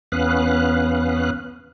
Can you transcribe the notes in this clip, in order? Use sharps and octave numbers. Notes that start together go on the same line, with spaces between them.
E2 B3 C#4 B4 F5 F#6